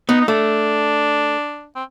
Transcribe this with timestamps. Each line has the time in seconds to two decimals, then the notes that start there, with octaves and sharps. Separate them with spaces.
0.09 B3 D#4
0.21 D#4
0.28 A3 D4
1.75 C4